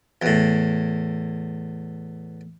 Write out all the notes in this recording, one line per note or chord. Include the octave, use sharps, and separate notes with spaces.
E2 A2